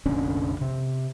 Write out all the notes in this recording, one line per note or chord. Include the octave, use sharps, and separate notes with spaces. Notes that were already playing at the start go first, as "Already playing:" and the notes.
F1 A#1 D3 C#4
C3